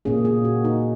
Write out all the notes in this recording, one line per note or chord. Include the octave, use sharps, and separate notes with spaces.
A#2 A#3 C#4 G#4
G#4
F#4
D#4